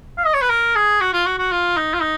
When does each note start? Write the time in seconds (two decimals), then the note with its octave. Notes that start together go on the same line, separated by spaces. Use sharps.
0.18 F5
0.26 D#5
0.34 C#5
0.42 B4
0.50 A#4
0.75 G#4
1.01 F#4
1.13 F4
1.26 F#4
1.39 F#4
1.52 F4
1.77 D#4
1.94 F4
2.02 D#4